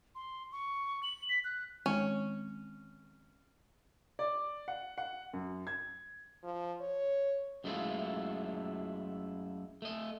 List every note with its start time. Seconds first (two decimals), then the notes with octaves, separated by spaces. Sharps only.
0.15 C6
0.52 C#6
1.03 F#7
1.29 B6
1.44 F#6
1.86 D#3 G#3 C4 C#4
4.19 D5
4.68 F#5
4.98 F#5
5.33 F#2
5.67 G#6
6.43 F3
6.81 C#5
7.64 F#2 G#3 A3 D4 E4 F4
9.82 A3 D#5